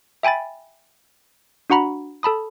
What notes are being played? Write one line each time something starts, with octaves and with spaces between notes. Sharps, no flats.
E5 G5 G#5 B5 A6
D4 F#4 F#5 A#5 B5
A4 A5 B5 D#6